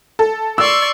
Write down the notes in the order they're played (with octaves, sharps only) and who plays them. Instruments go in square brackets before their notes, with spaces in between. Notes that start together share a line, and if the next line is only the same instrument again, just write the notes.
[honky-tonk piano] A4
[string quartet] D5 C6 C#6 [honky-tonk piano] E6